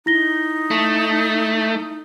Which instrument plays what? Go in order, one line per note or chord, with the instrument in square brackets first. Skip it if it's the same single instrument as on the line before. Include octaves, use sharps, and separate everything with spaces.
[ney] D#4 [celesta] E4 A#6 G7
[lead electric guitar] A3